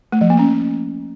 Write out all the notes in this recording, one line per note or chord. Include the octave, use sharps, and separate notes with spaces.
A3
F3
A#3
C#4